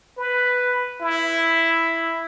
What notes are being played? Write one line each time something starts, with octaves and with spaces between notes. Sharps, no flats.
B4
E4